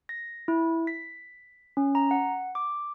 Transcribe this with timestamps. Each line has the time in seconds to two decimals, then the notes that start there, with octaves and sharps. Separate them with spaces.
0.09 A#6
0.48 E4
0.87 B6
1.77 C#4
1.95 A#5
2.11 F#5
2.55 D6